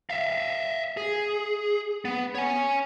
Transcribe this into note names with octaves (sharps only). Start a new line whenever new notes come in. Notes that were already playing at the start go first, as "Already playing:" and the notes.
E5 F5
G#4
B3
C#5 G#5